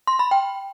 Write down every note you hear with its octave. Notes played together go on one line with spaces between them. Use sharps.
C6
B5
G5